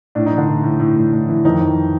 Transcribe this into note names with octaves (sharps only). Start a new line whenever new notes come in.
A2 D4
D#4
E3
D3 D4
A2
A2
A2
A2
A2
E3
F2 D#3 D#4
F2